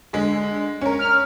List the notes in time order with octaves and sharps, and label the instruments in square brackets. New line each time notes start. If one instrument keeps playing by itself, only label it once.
[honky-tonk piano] D3 G#3
C#4 A#4
[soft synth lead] F6